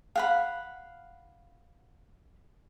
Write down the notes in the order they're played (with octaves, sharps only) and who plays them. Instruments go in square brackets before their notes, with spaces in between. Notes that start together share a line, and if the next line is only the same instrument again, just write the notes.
[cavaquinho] F5 F#5 B5